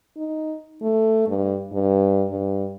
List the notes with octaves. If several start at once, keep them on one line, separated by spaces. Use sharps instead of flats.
D#4
A3
G2
G2
G2